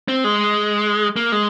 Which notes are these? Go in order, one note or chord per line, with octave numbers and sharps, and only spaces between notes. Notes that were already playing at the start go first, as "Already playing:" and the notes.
C4
G#3
A#3
G#3